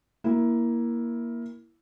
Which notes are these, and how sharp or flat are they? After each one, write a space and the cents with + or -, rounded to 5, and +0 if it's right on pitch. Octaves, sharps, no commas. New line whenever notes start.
A#3 +15 E4 +0